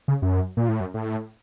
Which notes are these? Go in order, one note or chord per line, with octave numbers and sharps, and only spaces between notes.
C#3
F#2
A#2
A2
F#2
A2